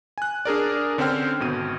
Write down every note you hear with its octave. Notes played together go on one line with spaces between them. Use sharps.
G#5 F#6
D4 G#4 A#4 D5
D3 C4 C#4 C5 G5 F6
G#1 B2 D#7